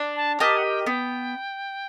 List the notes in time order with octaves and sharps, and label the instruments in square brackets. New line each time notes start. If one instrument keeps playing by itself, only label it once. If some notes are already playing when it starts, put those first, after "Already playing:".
Already playing: [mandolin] D4
[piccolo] A5
[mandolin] G4 A#4 D#5 [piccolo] A5
[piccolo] F#5
G5
[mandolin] B3 [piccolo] G5